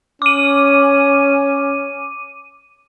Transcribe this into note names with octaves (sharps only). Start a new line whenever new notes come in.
C#4 D6 D#7